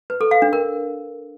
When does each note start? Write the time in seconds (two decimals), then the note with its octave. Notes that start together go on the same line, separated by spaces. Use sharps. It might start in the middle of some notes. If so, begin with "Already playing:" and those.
0.10 B4
0.21 A4
0.31 F5
0.42 D4
0.53 A#4